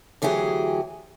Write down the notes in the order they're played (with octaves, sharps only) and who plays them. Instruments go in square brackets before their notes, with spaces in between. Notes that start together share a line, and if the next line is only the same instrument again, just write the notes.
[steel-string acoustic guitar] D2 E3 F#3 G4 G#4